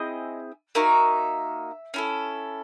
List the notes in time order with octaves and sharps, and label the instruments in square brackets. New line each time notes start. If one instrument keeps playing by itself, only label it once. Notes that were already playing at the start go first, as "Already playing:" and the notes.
Already playing: [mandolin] C4 E4 G#4 D#5
A#3 D#4 F#4 E5
C#4 E4 A4